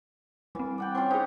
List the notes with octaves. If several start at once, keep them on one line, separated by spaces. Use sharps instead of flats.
E3 G3 C4
D5 F#5 G5
C4 C#4 F4 D6
D#4 G#4 B4 C5